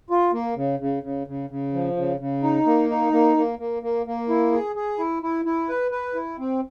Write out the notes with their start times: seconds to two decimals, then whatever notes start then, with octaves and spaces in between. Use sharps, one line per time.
0.10 F4
0.33 A#3
0.56 C#3
0.79 C#3
1.03 C#3
1.27 C#3
1.50 C#3
1.73 F3
1.96 C#3
2.20 C#3
2.43 D#4
2.66 A#3
2.90 D#4
3.12 A#3
3.36 A#3
3.59 A#3
3.82 A#3
4.06 A#3
4.29 E4
4.52 G#4
4.76 G#4
4.99 E4
5.23 E4
5.45 E4
5.69 B4
5.91 B4
6.15 E4
6.39 C4